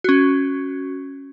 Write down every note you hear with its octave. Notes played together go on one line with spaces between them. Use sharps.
C#4 F#4